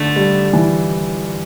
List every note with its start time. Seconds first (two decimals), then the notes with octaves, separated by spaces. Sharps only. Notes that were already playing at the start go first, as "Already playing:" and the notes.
Already playing: D3 A3
0.16 G3
0.53 E3